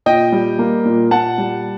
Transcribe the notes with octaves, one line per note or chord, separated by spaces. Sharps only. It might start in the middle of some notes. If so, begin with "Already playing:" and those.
A#2 D#5 G5
G3
A#3
A#2
A#2 F#5 A5
G3